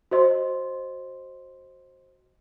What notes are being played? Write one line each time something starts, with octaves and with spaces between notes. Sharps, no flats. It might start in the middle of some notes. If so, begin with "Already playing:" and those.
F#4 C5 D#5 C6